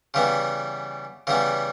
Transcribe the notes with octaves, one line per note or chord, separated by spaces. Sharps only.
C#3 E3 G3 B3
C#3 E3 G3 B3